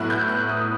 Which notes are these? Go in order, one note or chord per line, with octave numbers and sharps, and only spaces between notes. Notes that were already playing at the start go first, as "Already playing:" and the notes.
Already playing: A2 F#3 B3 E4 F#6
G6
F#6
D#6